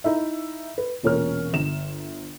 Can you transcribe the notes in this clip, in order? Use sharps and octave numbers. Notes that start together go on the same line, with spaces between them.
D#4 E4 E5
B4
E1 A#2 C#4 A#4 C#5 F6
G1 E7